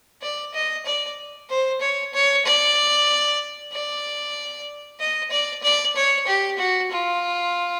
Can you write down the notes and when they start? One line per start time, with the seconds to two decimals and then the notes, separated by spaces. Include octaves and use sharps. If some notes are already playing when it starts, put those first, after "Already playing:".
0.22 D5
0.54 D#5
0.85 D5
1.49 C5
1.81 C#5
2.13 C#5
2.45 D5
3.72 D5
5.00 D#5
5.31 D5
5.63 D5
5.96 C#5
6.27 G4
6.59 F#4
6.91 F4